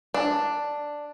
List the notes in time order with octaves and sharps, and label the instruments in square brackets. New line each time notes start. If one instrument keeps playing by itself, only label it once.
[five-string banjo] D4